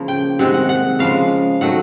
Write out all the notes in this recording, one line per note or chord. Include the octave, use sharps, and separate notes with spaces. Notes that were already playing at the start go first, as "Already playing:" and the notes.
Already playing: C#3 F3 A#3
G5
C3 D#3 G#3 C4 F#5
F#5
F#5
C#3 F3 G#3 F5
D#3 F#3 A3 F#5